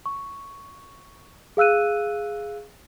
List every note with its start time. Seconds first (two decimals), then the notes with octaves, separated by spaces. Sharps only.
0.06 C#6
1.57 G#4 F5 E6 F#6 D#7